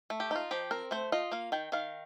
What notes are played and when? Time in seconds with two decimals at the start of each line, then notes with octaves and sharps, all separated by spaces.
0.10 A3
0.20 G4
0.31 D#4 F4
0.51 F3 G4
0.71 C4 A#4
0.91 A3 C5
1.12 F4 D#5
1.32 A#3 F5
1.52 D#3 G5
1.72 D#3 F5